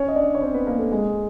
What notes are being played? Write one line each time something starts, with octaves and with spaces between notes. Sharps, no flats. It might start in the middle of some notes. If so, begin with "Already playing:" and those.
Already playing: C#4 C#5
D#5
D4 D5
C#5
C4 C5
B3 B4
A#3 A#4
A3 A4
G#3 G#4